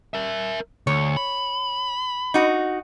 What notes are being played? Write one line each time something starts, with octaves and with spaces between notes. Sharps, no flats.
A#4 E5
D2 C#5
B5
D#4 F#4